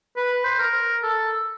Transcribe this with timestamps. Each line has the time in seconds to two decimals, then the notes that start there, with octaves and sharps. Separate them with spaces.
0.17 B4
0.44 C5
0.59 A#4
1.03 A4